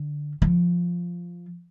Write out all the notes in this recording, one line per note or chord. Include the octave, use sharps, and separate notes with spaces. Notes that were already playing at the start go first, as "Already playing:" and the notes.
Already playing: D3
F3